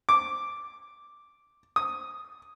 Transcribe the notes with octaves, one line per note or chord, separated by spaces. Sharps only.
D6
D#6